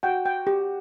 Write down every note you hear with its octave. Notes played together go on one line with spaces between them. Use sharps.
F#4 G5
G5
G4